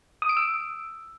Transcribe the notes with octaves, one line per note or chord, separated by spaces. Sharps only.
D#6
D7
E6